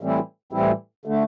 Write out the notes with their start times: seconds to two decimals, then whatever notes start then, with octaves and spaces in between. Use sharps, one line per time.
0.01 A2 E3 G3 C4 E4
0.52 A2 E3 G3 C4 E4
1.05 D3 A3